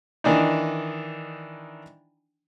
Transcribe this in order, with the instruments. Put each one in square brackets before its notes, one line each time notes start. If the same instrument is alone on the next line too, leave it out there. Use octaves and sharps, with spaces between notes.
[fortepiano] D#3 E3 D4 D#4